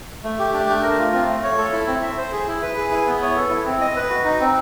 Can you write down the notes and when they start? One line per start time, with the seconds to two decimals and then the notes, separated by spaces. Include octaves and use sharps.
0.24 A3
0.39 G4
0.53 D4
0.69 A3
0.83 A#4
0.99 F4
1.13 C4
1.28 A3
1.43 C#5
1.57 A4
1.73 E4
1.87 C4
2.02 E5
2.18 C5
2.32 G#4
2.47 E4
2.62 B4
2.77 G#4
2.91 E4
3.07 B3
3.21 C#5
3.36 A4
3.50 E4
3.65 C4
3.81 D#5
3.96 B4
4.10 F#4
4.24 D#4
4.40 C4